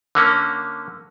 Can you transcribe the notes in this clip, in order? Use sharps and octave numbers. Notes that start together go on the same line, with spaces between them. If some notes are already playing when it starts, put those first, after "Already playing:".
D3 A#3 C#4